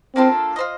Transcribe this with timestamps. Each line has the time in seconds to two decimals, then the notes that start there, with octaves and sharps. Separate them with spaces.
0.16 A#3 C4 D4 F4 A4
0.56 F4 C5 D#5